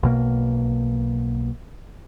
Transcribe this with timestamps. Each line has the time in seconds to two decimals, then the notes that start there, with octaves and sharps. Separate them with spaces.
0.03 B1 B2 A#3